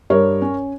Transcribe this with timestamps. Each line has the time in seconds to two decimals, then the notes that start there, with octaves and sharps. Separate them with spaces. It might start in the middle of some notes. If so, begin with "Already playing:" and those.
0.10 G2 A#4 C#5
0.42 C#4